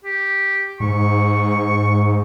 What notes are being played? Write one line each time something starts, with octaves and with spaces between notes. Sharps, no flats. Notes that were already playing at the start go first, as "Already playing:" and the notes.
G4
G#2 C#6